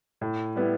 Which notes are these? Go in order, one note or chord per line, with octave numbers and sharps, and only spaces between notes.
A2
G3 B3 E4